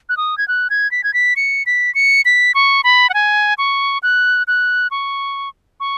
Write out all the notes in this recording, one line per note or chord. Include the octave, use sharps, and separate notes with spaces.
F#6
D#6
G#6
F#6
G#6
B6
G#6
B6
C#7
B6
C#7
B6
C#6
B5
F#5
G#5
C#6
F#6
F#6
C#6
C#6